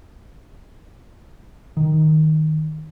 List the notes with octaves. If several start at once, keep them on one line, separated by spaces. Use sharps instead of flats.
D#3